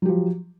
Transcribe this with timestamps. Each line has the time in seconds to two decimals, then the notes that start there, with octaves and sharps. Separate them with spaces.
0.02 F#3
0.05 G4
0.09 F3